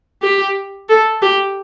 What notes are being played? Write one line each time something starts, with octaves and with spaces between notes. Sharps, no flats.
G4
A4
G4